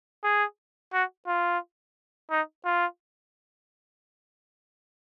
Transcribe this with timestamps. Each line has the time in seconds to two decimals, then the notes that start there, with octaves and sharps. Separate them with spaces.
0.24 G#4
0.93 F#4
1.27 F4
2.30 D#4
2.65 F4